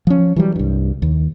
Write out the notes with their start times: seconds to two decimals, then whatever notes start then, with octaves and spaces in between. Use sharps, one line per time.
0.07 F3 C#4
0.36 E3 F#3 G3
0.56 C2 G2
1.02 D#2